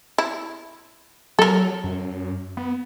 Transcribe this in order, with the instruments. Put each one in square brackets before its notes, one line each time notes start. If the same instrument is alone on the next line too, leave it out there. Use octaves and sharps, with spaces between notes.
[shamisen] E4
[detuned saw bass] F#3 [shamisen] A4 A#4
[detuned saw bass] F#2
B3